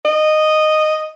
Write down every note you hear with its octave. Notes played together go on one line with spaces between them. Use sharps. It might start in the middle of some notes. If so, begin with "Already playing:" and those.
D#5